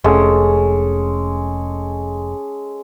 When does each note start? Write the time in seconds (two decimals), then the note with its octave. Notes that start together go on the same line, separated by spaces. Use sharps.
0.04 F1 G#3 C#4 A4